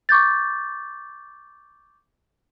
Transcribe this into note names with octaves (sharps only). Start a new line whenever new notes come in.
C#6 D6 G6 A6